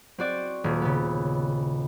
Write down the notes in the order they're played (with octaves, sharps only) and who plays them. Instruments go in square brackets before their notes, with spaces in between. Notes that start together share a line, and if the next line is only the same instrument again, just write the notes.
[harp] C4 F#4 D5
D#1
C#3 B3